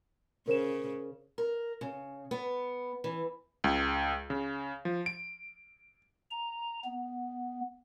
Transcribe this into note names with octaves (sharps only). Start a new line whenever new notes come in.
C#3 A#4 C5 E7
A#4
C#3
B3
E3
C#2
C#3
F3
D7
A#5
B3